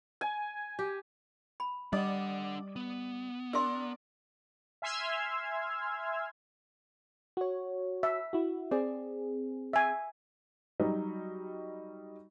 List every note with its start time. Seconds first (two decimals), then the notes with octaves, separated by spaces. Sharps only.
0.21 G#5
0.79 G4
1.60 B5
1.93 G3 D4 D5 D#5 F#5 D6 D#6
2.76 B3
3.53 D4 A#4 D5 C6 E6
4.82 E5 G#5 C6 E6 F6 G#6
7.37 F#4 C#5
8.03 E5
8.33 E4 F#4
8.71 C4 G#4 D5
9.73 E5 G#5
10.80 F#3 G3 D#4 F#4